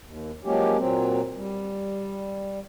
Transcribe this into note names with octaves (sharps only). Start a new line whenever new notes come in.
D#2
F3 F#3 G#3 A#3 C#4 G4
A#2 F#3 C4
G3